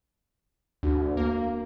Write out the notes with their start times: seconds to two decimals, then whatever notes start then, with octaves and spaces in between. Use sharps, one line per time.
0.83 D2 D4 F#4
1.17 A#3